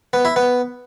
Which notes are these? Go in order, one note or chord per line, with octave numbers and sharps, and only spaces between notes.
B3
E4
B3